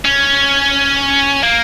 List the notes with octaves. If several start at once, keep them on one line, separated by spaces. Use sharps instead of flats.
C#4
A#3